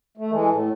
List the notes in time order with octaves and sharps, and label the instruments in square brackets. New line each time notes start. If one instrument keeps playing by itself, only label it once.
[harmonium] A3
[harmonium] E3 G#3 [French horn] A4
[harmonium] A2